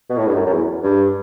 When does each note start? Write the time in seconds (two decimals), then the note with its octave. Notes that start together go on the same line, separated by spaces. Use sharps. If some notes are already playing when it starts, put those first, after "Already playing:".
0.09 B2
0.17 A2
0.27 G2
0.36 F#2
0.46 F#2
0.52 E2
0.83 G2